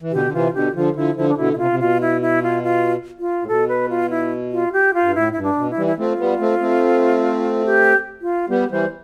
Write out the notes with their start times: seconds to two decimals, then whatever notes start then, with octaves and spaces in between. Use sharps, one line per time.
0.01 E3
0.12 B2 D3 G4
0.25 D3
0.33 C3 E3 F4
0.54 B2 D3 G4
0.75 D3 F3 F4
0.95 D3 F3 E4
1.16 D3 F3 E4
1.29 D4
1.37 B2 D3 E4
1.53 B2 E4
1.58 C3 F4
1.71 C3
1.79 B2 F4
2.01 E4
2.22 E4
2.43 F4
2.64 F4
3.19 F4
3.42 A2
3.47 B2 A4
3.68 B4
3.89 F4
4.10 E4
4.52 F4
4.72 G4
4.94 F4
5.02 G2
5.15 A2 E4
5.33 G2 E4
5.43 D4
5.57 B2
5.70 E4
5.77 E3 G3
5.86 E4
5.98 A3 C4 F4
6.19 G3 B3
6.40 A3 C4
6.61 A3 C4
7.66 G4
8.22 F4
8.49 G3 B3 G4
8.70 E3 G3 C5